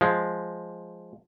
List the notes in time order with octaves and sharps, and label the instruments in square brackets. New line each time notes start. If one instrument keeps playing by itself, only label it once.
[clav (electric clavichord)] F3 G#3